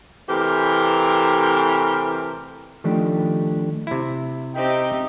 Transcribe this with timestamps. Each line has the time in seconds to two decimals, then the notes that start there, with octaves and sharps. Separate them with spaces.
0.29 C3 E3 A3 G4 A#4
2.84 D#3 F3 A3 D4 D#4 G4
3.87 C3 E4
4.55 C4 D#4 G4 D#5 E5 G5